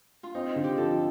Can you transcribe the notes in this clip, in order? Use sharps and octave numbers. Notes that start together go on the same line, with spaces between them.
F4
C4 D#4
F4
D3
G4
F3 A4